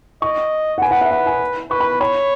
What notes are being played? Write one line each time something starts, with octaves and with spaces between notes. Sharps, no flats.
D#5 C#6
F#5
B4 G#5
F#5
E5
F#5
G#5
B4 C#6
B5
C#5 B5